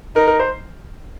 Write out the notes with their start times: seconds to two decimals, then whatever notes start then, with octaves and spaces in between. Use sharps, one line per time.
0.16 D#4 A#4
0.27 A#4
0.39 C5